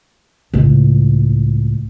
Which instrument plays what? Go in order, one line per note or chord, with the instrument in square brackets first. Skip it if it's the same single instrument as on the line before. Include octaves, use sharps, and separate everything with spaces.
[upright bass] C#2 A2